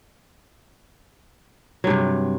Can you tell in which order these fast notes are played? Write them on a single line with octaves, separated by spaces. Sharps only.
F#3 G2 C3